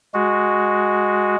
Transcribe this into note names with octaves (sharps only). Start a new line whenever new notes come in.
G#3 F#4